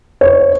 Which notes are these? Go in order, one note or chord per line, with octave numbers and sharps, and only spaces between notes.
C#5